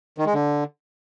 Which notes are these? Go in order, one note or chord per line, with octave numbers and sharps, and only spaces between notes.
D#3
G#3
D3